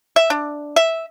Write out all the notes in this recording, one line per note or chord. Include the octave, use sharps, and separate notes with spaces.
E5
D4
E5